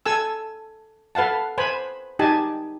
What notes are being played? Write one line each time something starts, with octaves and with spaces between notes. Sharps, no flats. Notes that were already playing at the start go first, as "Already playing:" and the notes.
A4 G#5 E6
A4 B4 F5 F#5 A5
B4 C5 G#5 B5
D#4 G4 G#5 A5